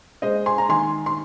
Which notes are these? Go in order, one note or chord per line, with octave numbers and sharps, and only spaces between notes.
G#3 C5 D#5
G#5 C6
A#5
D#3 G#5 C6
C6